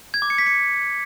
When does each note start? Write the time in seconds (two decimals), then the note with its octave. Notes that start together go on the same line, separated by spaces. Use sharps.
0.14 G#6
0.22 D6
0.30 C#7
0.38 B6
0.47 C#7